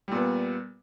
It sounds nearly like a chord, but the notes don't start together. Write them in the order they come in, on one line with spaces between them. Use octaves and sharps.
G3 A#2 B3